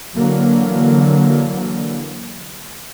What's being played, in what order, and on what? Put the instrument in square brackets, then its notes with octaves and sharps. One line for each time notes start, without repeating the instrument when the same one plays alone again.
[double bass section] D3 E3 F#3 A#3